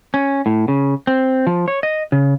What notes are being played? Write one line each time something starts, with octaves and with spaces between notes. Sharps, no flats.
C#4
A2
C#3
C4
F3
C#5
D#5
C#3